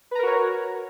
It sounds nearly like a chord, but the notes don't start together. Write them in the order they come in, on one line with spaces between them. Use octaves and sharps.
B4 A#5 A#4 F#4 C#5